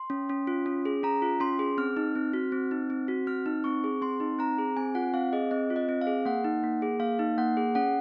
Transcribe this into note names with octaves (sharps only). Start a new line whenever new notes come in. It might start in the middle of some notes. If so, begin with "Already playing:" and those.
Already playing: C6
C#4
C#4
F4
C#4
G#4
C#4 A#5
F4
C#4 C6
G#4
C4 F6
D#4
C4
F#4
C4
D#4
C4
F#4
C4 F6
D#4
C4 C#6
G#4
C4 C6
D#4
C4 A#5
G#4
C4 G#5
F4 F#5
C4 F5
G#4 D#5
C4 D#5
F4
D#5
C4
F5
G#4
A#3 F#5
D#4
A#3
G#4
A#3 F5
D#4
A#3 F#5
G#4
C#4 F#5